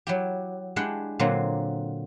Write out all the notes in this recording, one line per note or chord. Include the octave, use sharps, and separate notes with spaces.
F#3 E4 G4
G#3 D4 E4 G4 F#5
A#2 D3 F#3 A#3 C4